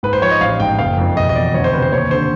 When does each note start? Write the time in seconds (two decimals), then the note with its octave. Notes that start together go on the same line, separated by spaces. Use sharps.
0.03 G#2 B4
0.13 C5
0.22 F3 C#5
0.31 D#5
0.40 A1 F5
0.60 G#2 G5
0.79 F#1 F5
0.98 F2
1.17 E1 D#5
1.29 D#5
1.35 E2 D5
1.54 D2 C#5
1.64 C5
1.73 C3 B4
1.82 C5
1.92 D#2 C#5
2.11 D3 C5